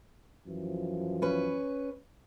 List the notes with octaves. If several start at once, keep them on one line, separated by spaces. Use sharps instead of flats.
F#2 E3 F3
C#4 B4